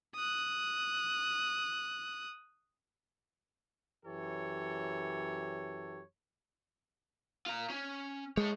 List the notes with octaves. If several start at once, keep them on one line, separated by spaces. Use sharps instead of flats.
D#6 F#6
F#2 E3 G4 A4 C#5
F4 A#5
C#4
G#3 A4 C#5